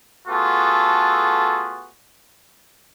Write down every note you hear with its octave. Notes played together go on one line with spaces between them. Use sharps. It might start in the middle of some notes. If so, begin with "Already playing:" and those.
A3 B3 F4 F#4 G#4 A4